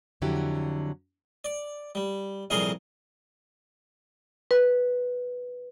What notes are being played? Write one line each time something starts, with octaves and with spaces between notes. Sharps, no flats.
F2 D3 F#3 E4 G4
D5
G3
C2 F2 A#2 G#4 A#4 C6
B4